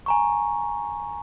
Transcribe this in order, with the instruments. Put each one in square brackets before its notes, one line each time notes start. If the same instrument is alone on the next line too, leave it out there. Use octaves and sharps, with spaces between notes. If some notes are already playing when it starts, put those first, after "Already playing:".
[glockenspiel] G#5 A#5 C#6